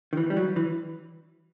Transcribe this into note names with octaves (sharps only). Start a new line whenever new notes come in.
D#3
E3
G3
F#3
E3